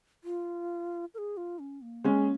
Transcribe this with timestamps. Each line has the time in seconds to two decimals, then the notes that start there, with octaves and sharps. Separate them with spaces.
0.24 F4
1.14 A#4
1.18 G#4
1.37 F4
1.59 C#4
1.82 A#3
2.04 G#3 C#4